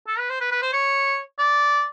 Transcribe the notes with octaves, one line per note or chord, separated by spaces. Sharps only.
A4
B4
C5
B4
B4
C5
C#5
D5